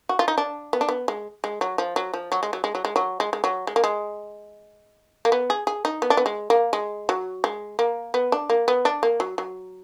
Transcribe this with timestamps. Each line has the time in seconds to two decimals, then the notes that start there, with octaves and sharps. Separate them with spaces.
0.09 F#4
0.19 F4
0.28 D#4
0.38 D4
0.73 B3
0.81 D4
0.89 B3
1.08 G#3
1.44 G#3
1.61 F#3
1.78 F3
1.96 F#3
2.13 F3
2.32 F#3
2.43 G#3
2.53 F#3
2.64 G#3
2.75 F#3
2.85 G#3
2.96 F#3
3.20 G#3
3.33 G#3
3.44 F#3
3.67 G#3
3.76 A#3
3.84 G#3
5.25 A#3
5.32 B3
5.50 G#4
5.67 G#4
5.85 D#4
6.02 B3
6.10 D4
6.17 B3
6.26 G#3
6.50 A#3
6.73 G#3
7.09 F#3
7.44 G#3
7.79 A#3
8.14 B3
8.32 D4
8.50 A#3
8.68 B3
8.85 D4
9.03 A#3
9.20 F#3
9.38 F#3